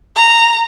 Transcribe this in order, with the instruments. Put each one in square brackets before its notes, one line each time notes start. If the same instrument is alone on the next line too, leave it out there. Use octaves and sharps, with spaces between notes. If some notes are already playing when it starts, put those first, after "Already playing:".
[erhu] A#5